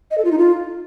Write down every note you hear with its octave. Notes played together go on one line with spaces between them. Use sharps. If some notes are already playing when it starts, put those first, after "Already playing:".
D#5
A4
F4
D#4
F4